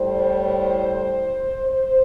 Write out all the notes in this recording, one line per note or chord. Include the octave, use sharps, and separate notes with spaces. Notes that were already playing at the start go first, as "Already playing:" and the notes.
Already playing: A2 G3 C5
C5